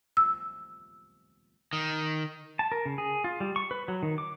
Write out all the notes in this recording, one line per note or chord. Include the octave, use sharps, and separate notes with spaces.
E6
D#3
A5
A#4
C#3
G#4
F4
G3
C#6
B4
F#3
D#3
D6